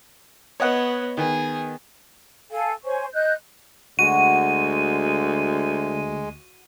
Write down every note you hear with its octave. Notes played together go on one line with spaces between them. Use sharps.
B3 C#5 D#5 F#5
D#3 B3 G#4
A4 F5 G#5
C5 C#5 G#5 C#6
D#5 F#6 G6
D2 G#3 F#4 D#7